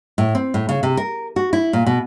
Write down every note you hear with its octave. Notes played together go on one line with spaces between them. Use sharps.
A2
C4
A2
C#3
C3
A#4
F#4
E4
A#2
B2